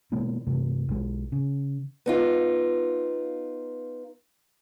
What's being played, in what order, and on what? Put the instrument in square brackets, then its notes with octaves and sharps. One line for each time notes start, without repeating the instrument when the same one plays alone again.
[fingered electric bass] B2 G#3 A#3 B3
G2 C3 A3
B1 G#3
C#3
[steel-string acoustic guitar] B3 D#4 F4